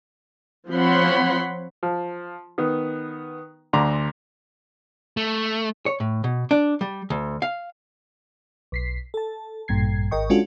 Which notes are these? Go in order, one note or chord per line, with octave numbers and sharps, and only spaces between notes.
F3 C4 C#5 F#5 B5 C6
F3
D#3 B3
D2 D3 A#5 C6 D6
A3
C#5
A2
B2
D4
G3
D2
F5
B1 B6 C7
A4 A5
A1 G2 A#2 G#6 C7
G#1 A#4 D#5 G5 C#6
G#3 C#4 D4 F4 F#4 A4